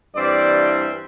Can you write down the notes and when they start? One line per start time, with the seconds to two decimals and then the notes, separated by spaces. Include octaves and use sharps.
0.15 G2 E3 G3 C4 D5